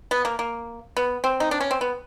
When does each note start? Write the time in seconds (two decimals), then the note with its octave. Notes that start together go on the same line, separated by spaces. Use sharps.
0.11 B3
0.25 A#3
0.39 A#3
0.97 B3
1.24 C4
1.40 D#4
1.51 D4
1.60 C#4
1.71 C4
1.81 B3